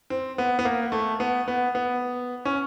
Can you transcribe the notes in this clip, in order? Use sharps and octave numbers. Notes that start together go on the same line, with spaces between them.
C4
B3
B3
A#3
A3
B3
B3
B3
C#4